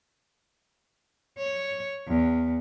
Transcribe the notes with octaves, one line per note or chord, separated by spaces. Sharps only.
C#5
E2